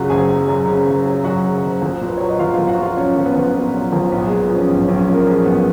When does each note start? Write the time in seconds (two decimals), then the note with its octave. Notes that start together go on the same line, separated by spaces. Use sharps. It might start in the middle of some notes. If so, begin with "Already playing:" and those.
Already playing: F#2 C#3 F#3 F4 F#4 F#5
0.10 F#1 G#4 G#5
0.29 F#3
0.48 F#2
0.67 C#3
0.86 F#1
1.06 F#3
1.24 F#2 F#4 F#5
1.44 C#3
1.63 F#1
1.82 A#1
2.01 A#2
2.07 B4
2.18 F#3 C#5
2.29 D#5
2.39 A#1 F4 F5
2.54 A#1 F4 F5
2.68 F#4 F#5
2.78 A#2 F4 F5
2.97 F#3 C#4 C#5
3.16 A#1
3.25 B3 B4
3.35 A#1
3.54 A#2 B3 B4
3.73 F#3
3.92 A#1
4.12 B1 B3 B4
4.26 A#2 G#3 G#4
4.50 F3 C#4
4.69 B1
4.83 B1 C#4
4.98 C#4
5.08 A#2 A#3 A#4
5.26 F3 G#3 G#4
5.46 B1 B3